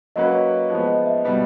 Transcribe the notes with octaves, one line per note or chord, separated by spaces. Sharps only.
F#3 A#3 C#4 F#4 B4 D#5
F3 G#3 B3
D#5
E5
B2 G3 B3